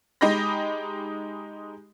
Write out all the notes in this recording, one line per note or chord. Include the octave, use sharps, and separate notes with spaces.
G#3 D#4 G4 D#5 B5 A#6